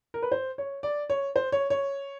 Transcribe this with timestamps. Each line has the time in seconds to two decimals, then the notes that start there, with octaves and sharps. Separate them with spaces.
0.14 A#4
0.22 B4
0.32 C5
0.58 C#5
0.83 D5
1.10 C#5
1.36 C5
1.52 C#5
1.70 C#5